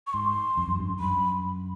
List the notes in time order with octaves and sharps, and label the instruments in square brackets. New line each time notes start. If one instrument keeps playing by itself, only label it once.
[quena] C#6
[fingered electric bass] G#2 [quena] C6
[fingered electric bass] F2
F#2
G2
F#2
[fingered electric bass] F#2 [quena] B5